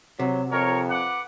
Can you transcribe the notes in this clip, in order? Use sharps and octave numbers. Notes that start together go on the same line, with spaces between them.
C3 F#3
F2 A#4 C#5
B4 F#5 D6